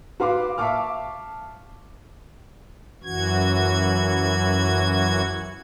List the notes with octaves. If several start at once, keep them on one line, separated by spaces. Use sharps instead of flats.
F#4 B4 F5 C6 D6
E5 F5 A5 C#6 D6 F6
F#2 E3 F#4 G#6